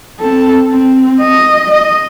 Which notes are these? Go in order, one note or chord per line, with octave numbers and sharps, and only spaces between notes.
C4 A4
C4
D#5
D#5